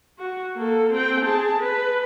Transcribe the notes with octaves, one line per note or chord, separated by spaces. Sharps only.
F#4
A#3 A4
C4 G5
G#4 A5
B4